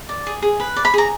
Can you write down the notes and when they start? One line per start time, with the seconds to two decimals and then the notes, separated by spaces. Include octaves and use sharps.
0.09 D5
0.27 G#4
0.42 G#4
0.60 B4
0.76 D5
0.85 B5
0.94 G#4 A#5